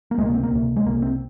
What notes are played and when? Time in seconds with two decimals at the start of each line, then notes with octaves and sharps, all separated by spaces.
0.11 A#3
0.17 C#2 G#3
0.22 C3 A#3
0.35 C4
0.43 A#3
0.52 C#2 C3
0.76 G#3
0.86 C2 C3 A#3
1.02 C4